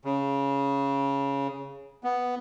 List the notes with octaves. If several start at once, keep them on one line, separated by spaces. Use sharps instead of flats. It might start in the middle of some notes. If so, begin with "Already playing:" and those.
C#3
B3